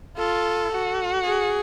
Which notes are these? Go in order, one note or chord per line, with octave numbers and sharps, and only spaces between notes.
F4 A4
F#4
G#4